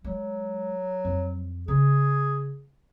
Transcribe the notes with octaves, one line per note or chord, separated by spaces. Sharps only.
F#3 G#3
F2
C#3 G#4